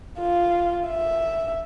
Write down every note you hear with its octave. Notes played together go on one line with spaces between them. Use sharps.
F4
E5